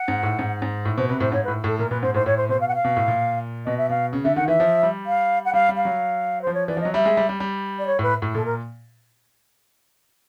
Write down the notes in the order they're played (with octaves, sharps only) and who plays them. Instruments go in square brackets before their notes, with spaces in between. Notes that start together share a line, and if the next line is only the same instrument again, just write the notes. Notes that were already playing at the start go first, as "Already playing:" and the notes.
Already playing: [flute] F#5
[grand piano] G#2
A2
G#2
G#2
A2
[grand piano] B2 [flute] C5
[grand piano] C3 [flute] B4
[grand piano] A2 [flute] C5
[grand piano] G#2 [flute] C#5
[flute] B4
[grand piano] A2
[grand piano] A2 [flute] A4
[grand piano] A#2 [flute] A#4
[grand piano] A#2 [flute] B4
[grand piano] G#2 [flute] C5
[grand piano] A2 [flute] C5
[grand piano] A2 [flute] C#5
[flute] C5
[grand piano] B2 [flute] C5
[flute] F5
F#5
F5
[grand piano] B2
A2
A#2
[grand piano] B2 [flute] D#5
[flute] E5
[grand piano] B2 [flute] F5
[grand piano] C#3
[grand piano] D3 [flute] E5
[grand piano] D#3 [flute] F#5
[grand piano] E3 [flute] E5
[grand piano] F3
G3
[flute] F5
F#5
[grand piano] G3 [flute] F5
[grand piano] G3
[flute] F5
[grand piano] F#3
[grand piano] F3 [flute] C5
[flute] C#5
[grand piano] E3 [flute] D5
[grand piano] F3
[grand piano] F#3 [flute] D#5
[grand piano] G3 [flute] E5
[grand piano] G#3
G3
G3
G3
[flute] D5
C#5
[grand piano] A2 [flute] B4
[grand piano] A2
[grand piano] A#2 [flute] A4
[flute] A#4